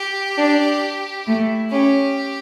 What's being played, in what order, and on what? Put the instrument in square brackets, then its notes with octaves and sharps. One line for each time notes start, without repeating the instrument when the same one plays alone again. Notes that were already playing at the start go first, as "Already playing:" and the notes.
Already playing: [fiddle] G4
[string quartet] D4
[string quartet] A3 [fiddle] E4
[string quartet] C#4 [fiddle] G4